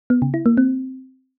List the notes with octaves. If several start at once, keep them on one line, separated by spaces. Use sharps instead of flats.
B3
C#3
E4
A#3
C4